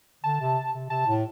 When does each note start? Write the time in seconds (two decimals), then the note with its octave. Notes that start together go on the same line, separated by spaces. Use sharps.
0.24 D3 A5
0.41 C3
0.74 C3
0.90 C3 A5
1.07 A2